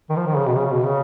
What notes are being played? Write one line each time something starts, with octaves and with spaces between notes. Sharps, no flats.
D#3
F3
D#3
C#3
B2
C#3
B2
C#3